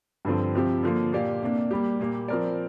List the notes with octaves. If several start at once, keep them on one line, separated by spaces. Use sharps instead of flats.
G2 D3 F3 C4
C3 F3 C4 G4
D3 F3 A#3
A#2 A#3 G4 D5 F5
C3 A#3 D4
G3 A#3 G4
A#2 A#3 G4
F3 C4 A#4 D5